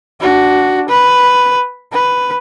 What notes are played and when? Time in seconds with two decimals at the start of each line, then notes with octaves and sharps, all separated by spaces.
0.21 D4 F#4
0.90 B4
1.93 B4